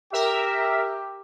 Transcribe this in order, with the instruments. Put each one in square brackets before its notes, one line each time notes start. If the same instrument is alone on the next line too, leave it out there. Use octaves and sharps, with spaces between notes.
[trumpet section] G4 [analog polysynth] A#4 E5